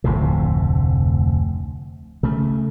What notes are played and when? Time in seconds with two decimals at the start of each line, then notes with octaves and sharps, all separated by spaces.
0.04 F1 D2 A2 C3
2.23 C#3 A3